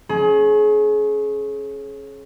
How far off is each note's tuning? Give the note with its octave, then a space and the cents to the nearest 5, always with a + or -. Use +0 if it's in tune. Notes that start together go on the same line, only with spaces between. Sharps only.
C#4 -25 G#4 +30